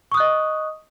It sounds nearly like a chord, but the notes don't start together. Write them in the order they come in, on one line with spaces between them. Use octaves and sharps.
C#6 D#6 F#6 D#5